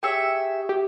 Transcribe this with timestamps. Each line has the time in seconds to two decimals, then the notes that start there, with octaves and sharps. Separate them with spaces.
0.03 G4 G#4 C#5 E5 G5
0.69 G4